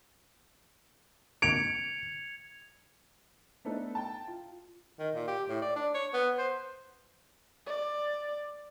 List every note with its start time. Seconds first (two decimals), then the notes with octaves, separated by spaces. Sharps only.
1.42 G#6 C#7 D7 F7
3.65 A3 B3 D4 D#4 A4 B4
3.95 G5 A5
4.27 F4
4.99 D#3
5.15 A#2
5.28 G4
5.49 A2
5.62 D5
5.76 D4
5.94 C#5
6.14 B3
6.38 C5
7.66 D5